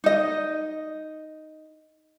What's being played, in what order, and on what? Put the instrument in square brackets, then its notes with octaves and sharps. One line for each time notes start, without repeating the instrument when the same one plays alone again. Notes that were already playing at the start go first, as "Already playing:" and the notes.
[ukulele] D#4 D#5